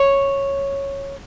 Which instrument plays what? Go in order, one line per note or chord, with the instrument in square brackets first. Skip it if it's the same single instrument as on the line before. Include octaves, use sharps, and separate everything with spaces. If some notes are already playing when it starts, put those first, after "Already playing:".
Already playing: [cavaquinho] C#5